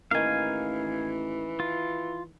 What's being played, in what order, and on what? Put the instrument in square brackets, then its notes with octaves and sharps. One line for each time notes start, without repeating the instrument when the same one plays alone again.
[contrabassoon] A1 [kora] D#3 A#3 [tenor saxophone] E3 [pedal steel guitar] F5 G#5
[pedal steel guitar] F4